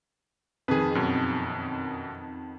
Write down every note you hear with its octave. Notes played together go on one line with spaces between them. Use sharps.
F2 D#3 G#4 B4
F#2 B2